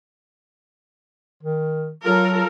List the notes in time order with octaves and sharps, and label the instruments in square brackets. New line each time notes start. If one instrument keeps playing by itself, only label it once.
[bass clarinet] D#3
[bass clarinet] F#3 [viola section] F4 A4 A#4